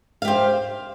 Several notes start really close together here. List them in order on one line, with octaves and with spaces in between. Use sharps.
F5 G4 C5